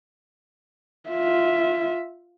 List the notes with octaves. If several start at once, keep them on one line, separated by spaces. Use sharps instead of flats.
F4 E5